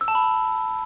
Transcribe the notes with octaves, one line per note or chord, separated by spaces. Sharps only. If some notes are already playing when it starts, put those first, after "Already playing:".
E6
A5
B5